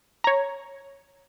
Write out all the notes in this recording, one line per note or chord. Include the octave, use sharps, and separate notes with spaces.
C#5 A#5